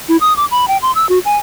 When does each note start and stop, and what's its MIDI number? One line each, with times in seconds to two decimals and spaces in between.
0.09 0.17 64
0.21 0.35 87
0.37 0.45 86
0.51 0.67 83
0.68 0.77 79
0.82 0.92 84
0.95 1.06 88
1.09 1.19 66
1.25 1.37 80